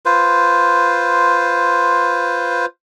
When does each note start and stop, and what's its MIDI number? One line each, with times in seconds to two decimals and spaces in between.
0.05 2.66 65
0.05 2.66 71
0.05 2.66 72